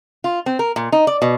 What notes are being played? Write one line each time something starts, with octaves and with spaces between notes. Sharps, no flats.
F4
C4
A#4
A#2
D#4
D5
B2